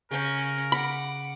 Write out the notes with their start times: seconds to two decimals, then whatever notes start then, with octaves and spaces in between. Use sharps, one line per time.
0.11 C#3 C#4 A#4 F5 G6
0.72 F#5 B5 D6